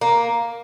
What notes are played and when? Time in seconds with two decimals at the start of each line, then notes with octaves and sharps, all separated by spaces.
0.01 A#3